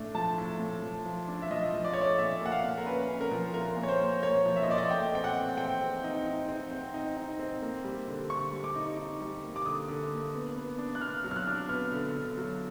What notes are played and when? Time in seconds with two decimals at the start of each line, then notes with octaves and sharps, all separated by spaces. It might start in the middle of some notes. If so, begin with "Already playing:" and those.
Already playing: A2 A3 D4
0.15 F3 A5
0.38 A2
0.60 A2
0.83 F3
1.06 F3
1.28 D4
1.42 E5
1.51 F3 D#5
1.74 F3
1.85 D5
1.94 A3 C#5
2.01 D5
2.18 A#2 E5
2.41 A#3 F#5
2.52 F5
2.64 A#2
2.78 A#4
2.86 C#4 B4
3.09 C#4
3.21 A#4
3.31 F3
3.54 A#2 A#4
3.77 A#2
3.83 C#5
3.89 C5
4.00 A#3
4.23 A#3 C#5
4.46 F3
4.56 E5
4.63 D#5
4.68 A#2 D5
4.78 D#5
4.90 A3 G5
5.13 C4 G5
5.24 F#5
5.36 E3
5.58 C4 G5
5.81 C4
6.04 D#4
6.26 D#4
6.48 C4
6.71 C4
6.94 D#4
7.17 D#4
7.39 C4
7.62 A#3
7.84 G3
8.07 D3
8.30 D3 C#6
8.52 G3
8.64 D6
8.76 D#4
8.97 D#4
9.21 G3
9.43 A#3
9.56 D6
9.66 D3 D#6
9.88 D3
10.10 A#3
10.34 B3
10.57 B3
10.78 D4
10.95 F#6
11.01 B3 F6
11.24 F#3
11.31 F6
11.36 F#6
11.47 D4
11.69 B3 F6
11.92 D3
12.15 D3
12.37 F#3